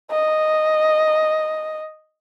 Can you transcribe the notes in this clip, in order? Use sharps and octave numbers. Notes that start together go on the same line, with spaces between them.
D#5